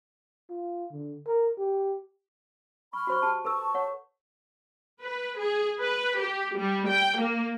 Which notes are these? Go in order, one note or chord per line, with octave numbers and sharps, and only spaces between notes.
F4
D3
A#4
G4
B5 C#6 F6
F#4 C5 C#6
G4 A5
A4 B4 A5 C#6 E6
C#5 F#5
B4
G#4
B4
G4
G3
G5
A#3